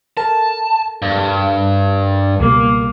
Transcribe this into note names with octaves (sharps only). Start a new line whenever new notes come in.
A4 A#4 A5
G2
C#2 B2 G3 A#3